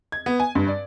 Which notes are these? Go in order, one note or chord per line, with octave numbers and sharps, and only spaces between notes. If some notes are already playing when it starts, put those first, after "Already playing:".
G#6
B3
G#5
G2
D5